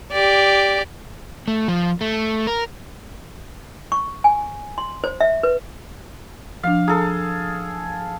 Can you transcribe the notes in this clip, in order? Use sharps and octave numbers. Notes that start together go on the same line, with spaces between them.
G4 D5
A3
F3
A3
A#4
C#6
G#5
C6
C5
E5
B4
F3 D4 F5
G#4 A4 A#5